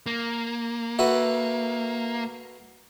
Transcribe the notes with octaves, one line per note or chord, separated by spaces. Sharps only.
A#3
F#4 A4 B4 E5